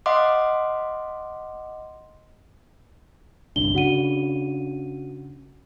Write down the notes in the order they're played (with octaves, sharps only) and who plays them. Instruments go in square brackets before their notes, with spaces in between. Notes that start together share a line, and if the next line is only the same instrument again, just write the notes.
[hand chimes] D#5 F5 F#5 C6 D6
[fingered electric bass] G1 C2 D4 [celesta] G7
[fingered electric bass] C#3 D4 [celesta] F#4 F#5 D#7